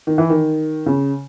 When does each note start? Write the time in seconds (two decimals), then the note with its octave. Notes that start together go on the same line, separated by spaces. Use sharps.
0.07 D#3
0.18 E3
0.30 D#3
0.86 C#3